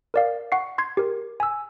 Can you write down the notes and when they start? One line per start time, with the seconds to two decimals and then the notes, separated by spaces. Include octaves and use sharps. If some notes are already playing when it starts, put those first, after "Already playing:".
0.14 A#4 D5 F5
0.52 F#5 C#6 C7
0.78 C6 G#6 C7
0.97 G4 A#4
1.40 G#5 E6